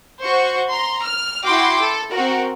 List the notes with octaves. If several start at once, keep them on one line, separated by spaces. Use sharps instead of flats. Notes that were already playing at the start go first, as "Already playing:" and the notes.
F#4 C5 C#6
A#5 C6
F6
E4 F#4 G5 C6 D6
A4
C4 F#4 A#4